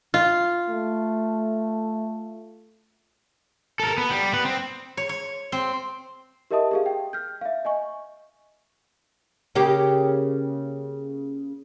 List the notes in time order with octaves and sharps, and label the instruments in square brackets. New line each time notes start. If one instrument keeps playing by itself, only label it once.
[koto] F4
[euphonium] A3
[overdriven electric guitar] A4 A#4
B3
G3
B3 B4
C4
[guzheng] C#5
C#5
C4
[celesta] G4 A#4 D#5 E5 A5 D#6
G4 G#4 F5
G5
F6 G6
E5 F5
D#5 G#5 C#6
[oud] C#3 A#3 G4